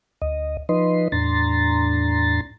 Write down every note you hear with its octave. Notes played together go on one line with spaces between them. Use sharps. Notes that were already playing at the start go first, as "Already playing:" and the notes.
D2 D#5
F3 D#4 B4 D#5 C6
E2 A2 D4 A#5 C6 A6